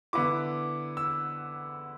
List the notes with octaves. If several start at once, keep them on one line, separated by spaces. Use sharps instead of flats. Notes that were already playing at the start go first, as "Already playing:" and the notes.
D3 B3 E4 D6
E6